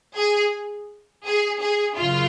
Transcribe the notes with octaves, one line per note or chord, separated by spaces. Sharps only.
G#4
G#4
G#4
F#2 C#3 F4